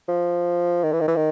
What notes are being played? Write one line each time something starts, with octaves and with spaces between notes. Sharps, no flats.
F3
D#3
E3
D#3
E3
D#3